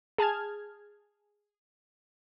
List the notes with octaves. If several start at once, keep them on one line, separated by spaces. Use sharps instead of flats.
G#4 A5 F6 G#6